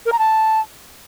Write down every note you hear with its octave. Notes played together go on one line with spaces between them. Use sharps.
A#4
A#5
A5